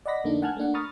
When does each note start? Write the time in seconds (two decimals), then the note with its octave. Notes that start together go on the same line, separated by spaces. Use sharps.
0.06 D5 D#5 F#5 B5 A#6 B6
0.24 F2 D3 A3 A#3 D4 D#4
0.42 F#5 G#5 A5 F6 F#6 G#6
0.57 A3 A#3 D4 F#5
0.74 A#5 B5 C#6 D#6 F6 A6